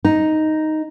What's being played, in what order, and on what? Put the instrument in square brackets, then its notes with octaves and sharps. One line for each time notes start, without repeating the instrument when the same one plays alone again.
[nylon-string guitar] D#4